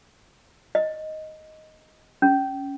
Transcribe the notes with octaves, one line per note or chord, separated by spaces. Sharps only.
D#5
C#4